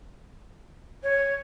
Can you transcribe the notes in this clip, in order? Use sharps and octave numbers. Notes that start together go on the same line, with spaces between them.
C#5